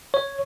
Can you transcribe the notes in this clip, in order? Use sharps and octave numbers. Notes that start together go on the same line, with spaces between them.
C#5